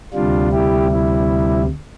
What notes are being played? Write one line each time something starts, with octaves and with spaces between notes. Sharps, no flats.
D2 C3 G3 D4 F4
E4 G4
E4